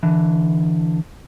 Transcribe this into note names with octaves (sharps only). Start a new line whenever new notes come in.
D3 E3